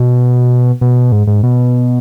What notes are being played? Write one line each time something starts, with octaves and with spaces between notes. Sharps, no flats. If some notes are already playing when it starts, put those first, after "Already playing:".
Already playing: B2
B2
G#2
G#2
B2